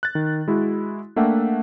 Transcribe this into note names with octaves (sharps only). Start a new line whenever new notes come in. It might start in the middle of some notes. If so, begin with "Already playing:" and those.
F#6 A6
D#3
G#3 E4 F#4
A3 A#3 D4 E5 F#5 G5